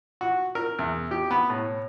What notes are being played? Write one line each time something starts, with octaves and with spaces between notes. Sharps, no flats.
F#4
A#4
E2
G4
B3
A2